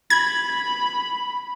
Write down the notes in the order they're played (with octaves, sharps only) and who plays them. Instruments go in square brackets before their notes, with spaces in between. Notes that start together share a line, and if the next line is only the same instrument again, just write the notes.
[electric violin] B5 [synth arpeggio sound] G#6